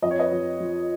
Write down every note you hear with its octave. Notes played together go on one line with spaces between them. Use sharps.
F2 D#5
C#5
B4 D#5
F2
F3